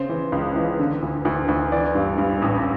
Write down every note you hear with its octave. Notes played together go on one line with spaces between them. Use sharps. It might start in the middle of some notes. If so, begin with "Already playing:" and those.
Already playing: C#3 C5
E3
C#2
E3
D3
D2
D2
D2
E3 D5
G2
G2
A1